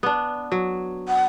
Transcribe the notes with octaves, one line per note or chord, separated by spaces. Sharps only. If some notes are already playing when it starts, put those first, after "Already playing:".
B3 D4
F#3
F#5